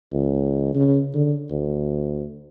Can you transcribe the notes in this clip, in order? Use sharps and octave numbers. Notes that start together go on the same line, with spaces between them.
C#2
C#3
D3
D2